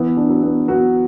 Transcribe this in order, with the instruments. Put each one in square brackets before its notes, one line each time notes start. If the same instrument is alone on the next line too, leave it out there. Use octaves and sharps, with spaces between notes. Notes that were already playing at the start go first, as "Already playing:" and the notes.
Already playing: [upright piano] E3 E4 [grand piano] B3
[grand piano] D4
[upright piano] F#3 F#4
[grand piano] B3
[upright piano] F#3 F#4 [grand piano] B3